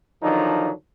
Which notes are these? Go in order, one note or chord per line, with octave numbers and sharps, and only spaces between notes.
D3 D#3 F3 F#3 D4 D#4